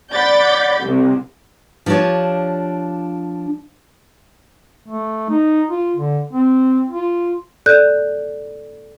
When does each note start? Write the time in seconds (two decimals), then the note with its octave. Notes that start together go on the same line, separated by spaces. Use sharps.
0.13 D5 F#5 B5 G6 A6 B6
0.81 C2 C3
1.86 F3 D4 F4 G4 C#5
4.88 A3
5.30 D#4
5.71 F4
5.96 D3
6.33 C4
6.90 F4
7.66 A4 D5 F#6 G6